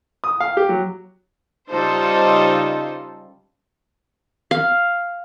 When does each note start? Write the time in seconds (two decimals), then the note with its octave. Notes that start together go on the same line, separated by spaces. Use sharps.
0.24 D#6
0.40 F5
0.57 G4
0.69 F#3
1.71 C#3 G3 D#4 F4 A4 C5
4.51 F5